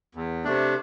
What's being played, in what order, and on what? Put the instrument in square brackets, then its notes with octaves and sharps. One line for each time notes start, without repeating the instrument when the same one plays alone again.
[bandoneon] E2
C3 A3 D4